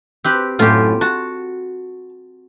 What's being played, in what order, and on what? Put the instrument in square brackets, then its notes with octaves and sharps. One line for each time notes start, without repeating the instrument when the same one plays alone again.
[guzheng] C4 G4 B4
[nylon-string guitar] F#2 A2 A3 [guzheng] F4 G4
[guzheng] F#4 [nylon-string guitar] A5